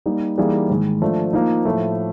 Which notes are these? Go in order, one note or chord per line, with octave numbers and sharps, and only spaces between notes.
G3 A#3 D#4
E3 G3 A#3 D#4 G#4
G#2 D#3 G#3
F3 A3 D4
F3 A#3 D#4
A2 F3 A3